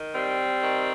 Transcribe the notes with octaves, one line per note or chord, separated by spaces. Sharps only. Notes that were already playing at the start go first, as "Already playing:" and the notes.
Already playing: D#3
G3 C4
D#3